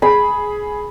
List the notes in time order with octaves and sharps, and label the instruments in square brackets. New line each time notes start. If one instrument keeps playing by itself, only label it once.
[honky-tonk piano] G#4 [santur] B5